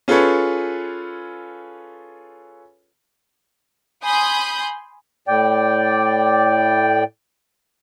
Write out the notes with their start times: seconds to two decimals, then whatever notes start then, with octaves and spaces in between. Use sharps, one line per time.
0.08 C#4 F4 G#4 A4 B4 C#5
4.04 G#5 B5 C6 D#6 G6
5.28 A2 D5 G5